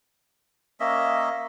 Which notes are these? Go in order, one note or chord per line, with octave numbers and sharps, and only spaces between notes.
A#3 C#4 D#5 E5